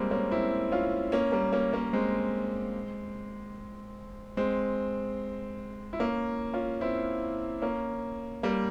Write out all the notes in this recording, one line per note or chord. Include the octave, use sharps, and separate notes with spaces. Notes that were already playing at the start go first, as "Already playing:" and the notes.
Already playing: G3 G#3 A#3 C4
A#3 C#4
C4 E4
C#4 F4
A#3 C#4
G3 A#3
A#3 C#4
A#3 C#4
G#3 C4
G#3 C4
E4
A#3 C#4
C#4 F4
C4 E4
A#3 C#4
G3 A#3